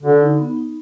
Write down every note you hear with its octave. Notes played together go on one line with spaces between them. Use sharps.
D3 F#4
D#4
B3
D#4